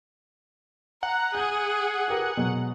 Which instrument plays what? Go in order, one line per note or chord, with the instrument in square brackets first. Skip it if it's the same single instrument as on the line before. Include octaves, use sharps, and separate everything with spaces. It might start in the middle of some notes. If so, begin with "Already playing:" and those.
[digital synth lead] F#5 [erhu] A#5
[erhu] G#4 [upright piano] G6 F#7
[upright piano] G4 A#4 B4
B2 F#3 G#3